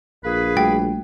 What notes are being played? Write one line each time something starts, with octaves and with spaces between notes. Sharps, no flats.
A#1 A#3 G#4 B4
G3 A3 F#4 G5